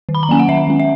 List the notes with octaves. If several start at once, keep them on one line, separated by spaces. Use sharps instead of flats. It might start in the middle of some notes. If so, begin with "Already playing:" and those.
D#3
B5
A#5
F#3 A#3 C#4 G#5
F#5
D#3 E5
G#3 C#4
E5